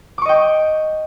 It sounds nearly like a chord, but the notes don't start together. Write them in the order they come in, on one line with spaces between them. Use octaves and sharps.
D6 C#6 D#5 G5